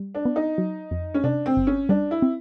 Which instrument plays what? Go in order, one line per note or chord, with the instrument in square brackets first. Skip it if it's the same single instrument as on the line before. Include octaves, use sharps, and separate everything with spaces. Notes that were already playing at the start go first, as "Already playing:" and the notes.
Already playing: [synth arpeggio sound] G3
[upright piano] D4
[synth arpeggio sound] B3
[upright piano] D#4
[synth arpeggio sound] F#3
F2
[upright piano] C#4
[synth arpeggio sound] C3 [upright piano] D4
[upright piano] C4
[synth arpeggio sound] G1
[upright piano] C#4
[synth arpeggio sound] G3 [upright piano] D4
[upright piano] E4
[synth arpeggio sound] C4